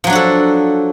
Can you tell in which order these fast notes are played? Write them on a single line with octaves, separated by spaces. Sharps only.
F3 F#3 D4 F#4 A4